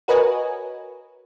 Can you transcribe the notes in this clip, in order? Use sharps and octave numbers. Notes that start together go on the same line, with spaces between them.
F#4 A#4 B4 C#5 D#5 G#5